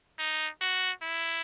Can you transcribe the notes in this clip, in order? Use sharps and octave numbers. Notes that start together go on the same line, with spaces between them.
D#4
F#4
E4